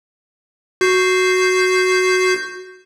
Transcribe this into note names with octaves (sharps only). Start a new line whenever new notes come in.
F#4 G6 C7